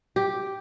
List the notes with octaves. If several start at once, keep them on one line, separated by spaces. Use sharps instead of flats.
G4